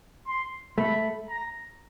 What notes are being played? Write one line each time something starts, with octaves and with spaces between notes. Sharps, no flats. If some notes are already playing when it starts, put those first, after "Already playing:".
C6
A3 B5
A#5